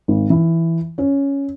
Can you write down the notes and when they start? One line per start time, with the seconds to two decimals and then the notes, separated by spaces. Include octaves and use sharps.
0.08 G#1
0.30 E3
0.98 C#4